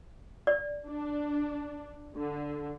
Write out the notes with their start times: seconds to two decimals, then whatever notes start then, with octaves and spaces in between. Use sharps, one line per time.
0.47 D5
0.88 D4
2.16 D3